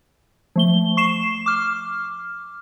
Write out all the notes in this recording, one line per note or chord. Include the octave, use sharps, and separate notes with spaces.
F3 A3 G7
C#6 C7 E7
D6 F6